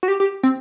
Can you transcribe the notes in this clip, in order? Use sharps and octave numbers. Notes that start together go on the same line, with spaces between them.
F#4
G4
G4
C4